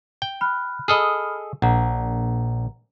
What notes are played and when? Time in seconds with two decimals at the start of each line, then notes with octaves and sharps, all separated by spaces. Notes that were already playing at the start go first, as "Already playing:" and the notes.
0.22 G5
0.41 B5 F6 F#6
0.88 G#4 A4 D#5 B5 D#6 F6
1.62 A#1 F#5 A#5